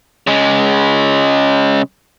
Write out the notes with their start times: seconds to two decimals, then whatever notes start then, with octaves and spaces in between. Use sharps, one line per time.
0.27 C#3 G#3